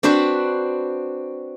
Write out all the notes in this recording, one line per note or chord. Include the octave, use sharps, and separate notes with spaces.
C4 D4 F#4 B4 C5